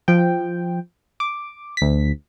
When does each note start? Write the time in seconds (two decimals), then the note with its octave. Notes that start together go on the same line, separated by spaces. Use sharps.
0.08 F3 G5
1.20 D6
1.77 D2 B6